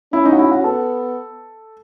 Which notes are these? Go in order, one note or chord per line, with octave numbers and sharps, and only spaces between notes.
C#4 E4
D#4
F#4
E4
F#4
B3 A4